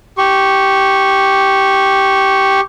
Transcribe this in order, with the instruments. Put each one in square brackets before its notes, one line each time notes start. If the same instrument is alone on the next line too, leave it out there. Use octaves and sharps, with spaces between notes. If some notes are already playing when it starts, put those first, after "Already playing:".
[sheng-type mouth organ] G4 C#6